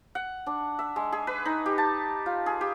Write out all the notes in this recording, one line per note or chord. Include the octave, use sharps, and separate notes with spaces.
F#5
D4
E5
G#3
G#4
B4
D#4
G4
A5
F4
G#4
G4